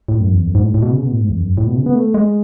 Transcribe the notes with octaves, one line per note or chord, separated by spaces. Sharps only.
A2
F#2
E2
F#2
G#2
A2
A2
B2
C#3
B2
A2
G#2
E2
F#2
A2
B2
C#3
B3
A3
G#3